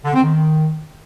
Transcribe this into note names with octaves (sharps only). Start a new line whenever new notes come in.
D3
C4
D#3